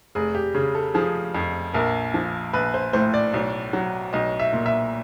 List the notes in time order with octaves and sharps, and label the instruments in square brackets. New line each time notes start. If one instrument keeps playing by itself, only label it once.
[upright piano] F1 G#4
G4
C#3 G#4
A4
F3 G#4
F2
A#1 A#4
F3
A#1 B4
C5
A2 C5
D5
B1
F#3
B1 D#5
E5
A#2
E5